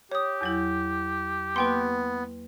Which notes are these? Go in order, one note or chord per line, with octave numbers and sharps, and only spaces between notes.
G4 C#5 D#6
E2 F#3 E4
A#3 B3 B4 G5 C6